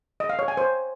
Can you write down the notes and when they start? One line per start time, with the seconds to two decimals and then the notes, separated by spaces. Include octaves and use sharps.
0.20 D#5
0.29 F5
0.39 C#5
0.48 G#5
0.57 C5